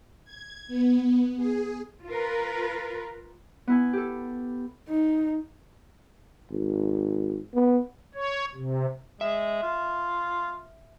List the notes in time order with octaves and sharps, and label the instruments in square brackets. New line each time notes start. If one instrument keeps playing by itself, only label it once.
[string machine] G#6
B3
G#4
[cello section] F4 A#4 B4
[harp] B3 E4 G#5
G4 A4
[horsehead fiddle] D#4
[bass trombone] G#1
B3
[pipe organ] C#5
C3
[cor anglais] G#3 [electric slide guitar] E5
[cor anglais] F4